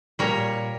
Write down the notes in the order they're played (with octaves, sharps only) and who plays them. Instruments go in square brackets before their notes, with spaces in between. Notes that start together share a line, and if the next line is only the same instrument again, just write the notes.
[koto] A#2 G3 A#4 C#5